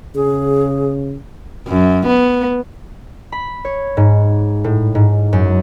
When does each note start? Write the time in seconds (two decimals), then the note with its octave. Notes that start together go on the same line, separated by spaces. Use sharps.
0.15 C#3 G#4
1.68 F#2
2.07 B3
3.32 B5
3.65 C#5
3.97 G#2
4.64 A2
4.95 G#2
5.33 F#2